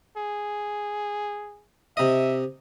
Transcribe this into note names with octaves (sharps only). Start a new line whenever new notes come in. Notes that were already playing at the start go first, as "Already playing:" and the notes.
G#4
C3 D#5 E5